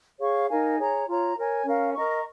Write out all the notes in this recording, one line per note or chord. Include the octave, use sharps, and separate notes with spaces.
G#4 C#5 F5 C#6
D#4 A#4 F5 G#5
G#4 C#5 A#5
F4 C#5 A#5
A#4 C#5 G#5
C#4 A#4 F5
A#4 D#5 A#5 C#6